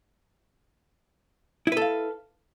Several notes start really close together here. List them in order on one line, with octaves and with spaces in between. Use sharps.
E4 B4 A4 F5